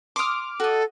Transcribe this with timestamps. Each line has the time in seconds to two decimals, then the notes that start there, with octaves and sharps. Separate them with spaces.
0.16 C6 D6 D#6 F6
0.60 F#4 A4 D#5